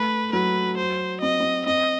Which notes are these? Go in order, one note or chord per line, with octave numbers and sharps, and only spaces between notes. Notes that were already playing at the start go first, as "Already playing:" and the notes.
Already playing: A3 B4
F#3 B4
C5
C4 D#5
C4
C4 D#5